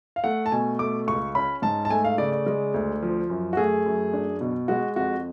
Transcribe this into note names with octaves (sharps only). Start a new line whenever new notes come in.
F5
A3 F#5
A5
B2 G#5
A3 D6
C#2 C#6
C#4 B5
G#2 A5
A5
A3 G#5
F5
C#3 D5
D5
G#3
D2
F3
F#2
F#4
A3 G#4
F#2
D4
B2
G#3 F#4
F2 F#4